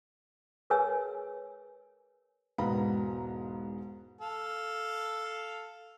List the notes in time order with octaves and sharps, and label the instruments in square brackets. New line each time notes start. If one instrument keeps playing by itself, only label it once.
[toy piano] G#4 A#4 B4 C#5 G#5 E6
[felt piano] E1 G#2 B3 F5 A#5 B5
[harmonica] A4 F5